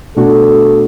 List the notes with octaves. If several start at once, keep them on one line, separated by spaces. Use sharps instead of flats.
B2 A3 D4 F#4 A4